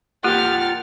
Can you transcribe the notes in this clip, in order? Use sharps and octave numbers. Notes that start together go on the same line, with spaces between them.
A#3 F4 G4 A#4 F#5 G5 F6 A6